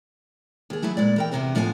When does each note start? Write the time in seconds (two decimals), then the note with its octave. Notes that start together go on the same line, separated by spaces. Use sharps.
0.70 D#2 G#4
0.82 F#3 A3 E4 G#4
0.97 A#2 G#3 D5
1.16 E3 A#4 G5
1.31 E2 G#2 C3 B3 A#4 C5
1.55 A2 F3 B3 C#4 C#5 G#5